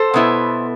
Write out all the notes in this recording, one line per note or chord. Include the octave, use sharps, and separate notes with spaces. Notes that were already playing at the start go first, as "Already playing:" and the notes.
Already playing: A4 C5
B2 B3 E4